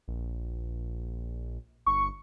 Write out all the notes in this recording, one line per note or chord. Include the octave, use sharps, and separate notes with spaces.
A#1
G1 C#6